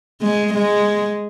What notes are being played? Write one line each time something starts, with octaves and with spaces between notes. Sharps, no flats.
G#3
G#3